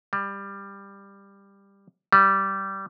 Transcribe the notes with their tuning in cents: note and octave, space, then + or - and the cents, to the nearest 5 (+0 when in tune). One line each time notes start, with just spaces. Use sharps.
G3 +15
G3 -15